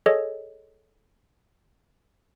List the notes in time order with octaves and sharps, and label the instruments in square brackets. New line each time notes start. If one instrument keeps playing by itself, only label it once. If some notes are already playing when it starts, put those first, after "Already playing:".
[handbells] G#4 A4 C#5 D#5